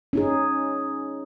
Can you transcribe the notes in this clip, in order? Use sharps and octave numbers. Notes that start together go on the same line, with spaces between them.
C#4 D#4 G#4